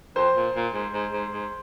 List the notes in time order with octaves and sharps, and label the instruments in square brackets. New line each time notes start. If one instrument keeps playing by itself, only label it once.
[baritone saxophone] F2 [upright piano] C5
[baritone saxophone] A#2
A#2
G#2
G#2
G#2
G#2